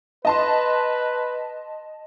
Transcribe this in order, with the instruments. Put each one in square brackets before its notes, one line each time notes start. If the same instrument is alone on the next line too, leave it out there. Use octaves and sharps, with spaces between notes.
[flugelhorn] B4 [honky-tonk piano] D#5 A5 C6